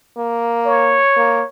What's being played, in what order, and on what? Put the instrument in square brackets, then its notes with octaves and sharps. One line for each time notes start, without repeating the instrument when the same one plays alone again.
[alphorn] A#3
[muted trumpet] C#5
[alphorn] A#3